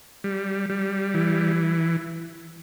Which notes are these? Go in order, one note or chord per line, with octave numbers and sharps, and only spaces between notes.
G3
G3
E3